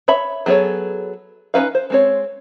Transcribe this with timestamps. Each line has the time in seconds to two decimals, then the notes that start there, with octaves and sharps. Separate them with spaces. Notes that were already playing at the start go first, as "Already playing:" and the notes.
0.08 C#5 E5 B5
0.46 F#3 B3 G#4 A4 C#5
1.54 C#4 D#4 E4 B4 F5
1.75 C5
1.90 G#3 C4 C#5